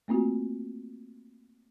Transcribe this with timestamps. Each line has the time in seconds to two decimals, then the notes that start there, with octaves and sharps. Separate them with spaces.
0.08 A3 A#3 C4 F4 F#4